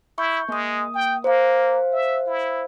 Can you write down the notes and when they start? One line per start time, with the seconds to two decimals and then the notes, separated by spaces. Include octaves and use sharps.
0.18 E4 C#6 G6
0.49 G#3 A#3 D#6
0.95 G5
1.24 A#3 C5 F5
1.93 E5
2.27 E4